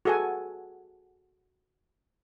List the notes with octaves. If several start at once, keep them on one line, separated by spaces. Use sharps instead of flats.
F#4 G#4 A4 F#5 G#5